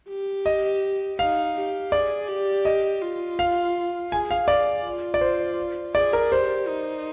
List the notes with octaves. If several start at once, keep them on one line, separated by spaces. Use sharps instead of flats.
G4
D#5
D#4 F5
G4
G#4 D5
G4
D#5
F4
F5
G#4 G#5
F5
D5
F4
D5
C5
G#4 D5
A#4
G4 C5
D#4